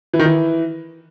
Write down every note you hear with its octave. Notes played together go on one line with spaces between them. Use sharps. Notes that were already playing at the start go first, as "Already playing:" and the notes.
E3
D#3
E3